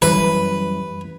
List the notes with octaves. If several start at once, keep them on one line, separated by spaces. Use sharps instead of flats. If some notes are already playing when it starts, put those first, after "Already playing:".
F#2 E3 G3 B4